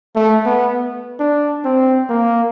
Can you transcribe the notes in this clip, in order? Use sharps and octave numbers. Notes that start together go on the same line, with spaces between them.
A3
B3
D4
C4
A#3